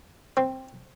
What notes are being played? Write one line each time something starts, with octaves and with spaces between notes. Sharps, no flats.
C4